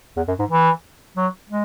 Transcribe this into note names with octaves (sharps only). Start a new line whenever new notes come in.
E2
F#2
G#2
E3
F#3
G#3